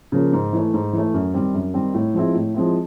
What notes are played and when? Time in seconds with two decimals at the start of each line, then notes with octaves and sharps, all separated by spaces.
0.12 C#3 F3 A#3
0.33 G#2
0.53 E3 A3
0.74 G#2
0.93 E3 A3
1.14 F#2
1.34 D#3 G3 C4
1.54 F#2
1.74 D#3 G3 C4
1.94 A2
2.14 F3 G#3 C4 E4
2.35 A2
2.54 F3 G#3 C4 E4